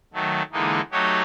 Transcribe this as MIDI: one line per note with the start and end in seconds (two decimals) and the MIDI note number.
0.13 0.42 51
0.13 0.42 54
0.13 0.42 57
0.52 0.81 50
0.52 0.81 52
0.52 0.81 56
0.52 0.81 58
0.52 0.81 63
0.92 1.23 54
0.92 1.23 57
0.92 1.23 63
0.92 1.23 66
0.92 1.23 67
0.92 1.23 73